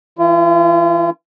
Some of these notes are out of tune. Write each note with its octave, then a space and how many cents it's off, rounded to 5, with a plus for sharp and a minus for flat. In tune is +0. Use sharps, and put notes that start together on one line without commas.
E3 +0 F4 -40